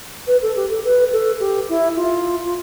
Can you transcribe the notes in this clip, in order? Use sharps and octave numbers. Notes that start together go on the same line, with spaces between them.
B4
A4
G4
A4
B4
A4
G4
E4
F4
F4